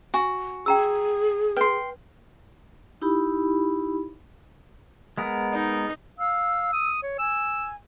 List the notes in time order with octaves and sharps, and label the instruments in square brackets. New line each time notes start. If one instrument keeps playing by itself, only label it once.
[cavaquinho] F#4 [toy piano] G#5
[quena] G#4 [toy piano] G5 A#5 E6
[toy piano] B4 [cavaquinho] G5 C6
[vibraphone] D#4 E4 G4 B5
[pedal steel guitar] G#3 B3 A#4
[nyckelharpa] D#4
[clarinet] F5 [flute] E6
[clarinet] D#6
C#5
[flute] G#5 [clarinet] E6